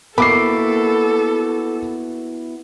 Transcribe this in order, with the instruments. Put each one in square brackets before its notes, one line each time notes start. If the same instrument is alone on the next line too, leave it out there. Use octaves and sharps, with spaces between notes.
[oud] A#3 [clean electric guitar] B3 E4 F#4 [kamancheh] A4 [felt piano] B5 D6 C7